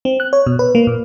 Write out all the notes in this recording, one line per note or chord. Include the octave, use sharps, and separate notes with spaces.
C4
F#6
C#5
B2
B4
A#3
A#2